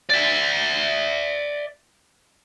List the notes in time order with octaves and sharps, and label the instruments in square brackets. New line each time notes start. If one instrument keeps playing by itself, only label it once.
[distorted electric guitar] D5 E5